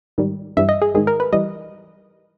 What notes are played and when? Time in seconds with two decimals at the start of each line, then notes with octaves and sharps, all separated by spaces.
0.18 G#2 D#3 G3
0.57 G2 E3 G3 E5
0.69 D#5
0.82 G#4
0.95 G#2 D#3 G#3 G#4
1.07 A#4
1.20 B4
1.33 E3 G3 D#5